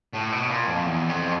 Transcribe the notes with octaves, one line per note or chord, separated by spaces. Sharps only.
A2
B2
A#2
F2
E2
F2